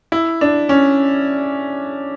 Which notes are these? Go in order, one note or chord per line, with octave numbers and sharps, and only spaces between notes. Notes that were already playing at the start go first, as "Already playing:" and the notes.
E4
D4
C#4